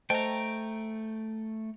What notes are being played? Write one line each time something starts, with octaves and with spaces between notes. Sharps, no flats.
A3 C5 D#5 G5 A5 A#5